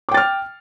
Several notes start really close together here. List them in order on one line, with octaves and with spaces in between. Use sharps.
D6 G5 A6 F6